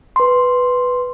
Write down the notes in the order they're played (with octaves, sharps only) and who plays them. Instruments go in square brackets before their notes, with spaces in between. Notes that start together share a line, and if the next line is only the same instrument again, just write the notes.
[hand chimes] B4 C6